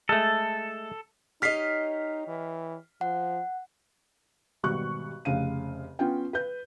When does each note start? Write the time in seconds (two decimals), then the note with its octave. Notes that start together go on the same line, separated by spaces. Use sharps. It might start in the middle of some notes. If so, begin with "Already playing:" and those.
0.09 G#3 A3 A4
1.42 D#4 G4 C#5 D#5 F6 B6 C7
2.28 E3
3.01 F3 F#5
4.63 G#1 B2 G3 C#6 F#6
5.25 F1 C#3 F5 D#7
5.99 B3 C#4 F4 G5
6.33 B4 G6